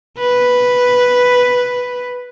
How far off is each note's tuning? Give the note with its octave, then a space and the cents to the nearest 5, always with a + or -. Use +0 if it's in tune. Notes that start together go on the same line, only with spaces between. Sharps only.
B4 +0